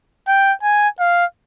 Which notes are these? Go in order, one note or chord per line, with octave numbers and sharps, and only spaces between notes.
G5
G#5
F5